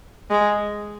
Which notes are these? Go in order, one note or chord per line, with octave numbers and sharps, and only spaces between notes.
G#3